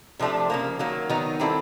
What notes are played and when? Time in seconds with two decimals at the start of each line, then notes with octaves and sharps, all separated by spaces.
0.19 C3 F3 A3 D4 G4
0.50 C#3 F3 A#3
0.79 D#3 F#3 A#3
1.09 D#3 F#3 B3 D#4
1.40 D#3 G3 C4 E4 A4